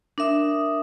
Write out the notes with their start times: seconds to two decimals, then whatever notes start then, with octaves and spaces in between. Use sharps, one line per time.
0.18 D4 A#4 E5 D#6